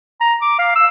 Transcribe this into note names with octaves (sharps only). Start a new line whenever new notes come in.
A#5
D6
F5
E6